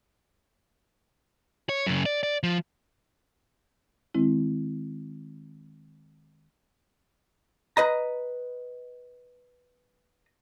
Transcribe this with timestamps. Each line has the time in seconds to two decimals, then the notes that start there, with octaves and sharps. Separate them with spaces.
1.69 C#5
1.87 F#2 C#3
2.06 D5
2.23 D5
2.43 F3
4.14 D#3 G#3 C4 E4
7.77 B4 D#5 A#5